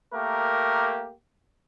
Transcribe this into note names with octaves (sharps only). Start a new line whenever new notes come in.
A3 A#3 G4 A#4